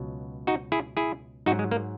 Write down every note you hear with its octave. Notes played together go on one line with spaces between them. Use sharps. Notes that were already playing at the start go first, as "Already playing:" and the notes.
Already playing: C#2 B2 F#3
D#4 F#4
E4 G#4
E4 G#4
G#2 F#3 D#4 F#4
G#3
A#3